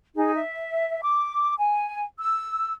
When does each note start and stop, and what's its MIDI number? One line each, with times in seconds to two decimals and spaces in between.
0.15 0.35 63
0.15 0.35 68
0.36 1.01 76
1.03 1.55 86
1.58 2.04 80
2.19 2.73 88